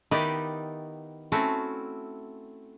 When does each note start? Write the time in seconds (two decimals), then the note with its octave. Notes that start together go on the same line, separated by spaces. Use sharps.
0.11 D#3 B3 D#4 E4 G4 D5
1.32 A3 C4 C#4 E4 F#4